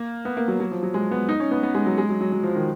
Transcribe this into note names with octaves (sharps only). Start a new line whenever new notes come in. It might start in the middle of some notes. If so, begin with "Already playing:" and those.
Already playing: A#3
B3
A#3
F#3
F#3
F3
F#3
G#3
B3
D#4
C#4
B3
B3
G#3
F#3
G#3
F#3
F#3
F#3
F3
D#3